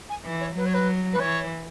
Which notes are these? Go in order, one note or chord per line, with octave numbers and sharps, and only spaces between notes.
G#5
E3
C#5
F#3 B4
C#5
B4
B4
E3 C#5